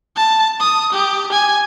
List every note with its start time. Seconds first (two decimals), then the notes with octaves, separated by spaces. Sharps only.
0.16 A5
0.60 D#6
0.93 G4
1.32 G#5